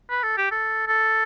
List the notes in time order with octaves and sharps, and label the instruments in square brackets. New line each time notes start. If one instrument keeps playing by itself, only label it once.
[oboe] B4
A4
G4
A4
A4